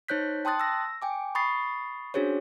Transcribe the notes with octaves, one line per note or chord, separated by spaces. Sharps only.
D#4 C5 C#5 F#6 G6 B6
G5 A5 C6 D#6 F#6 A6
E6 A#6
G5 G#5 D6
B5 C#6 D#6 A6 C7
C#4 D4 F#4 G#4 C5 C#5